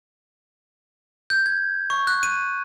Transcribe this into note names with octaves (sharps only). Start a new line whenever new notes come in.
G6
G#6
C#6
F#6
D#7